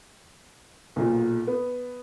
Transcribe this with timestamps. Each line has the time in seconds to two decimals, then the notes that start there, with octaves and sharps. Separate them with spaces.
0.96 B1 A#2
1.47 B3